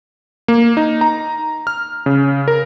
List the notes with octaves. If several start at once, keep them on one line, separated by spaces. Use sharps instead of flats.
A#3
D#4
A#5
F6
C#3
A#4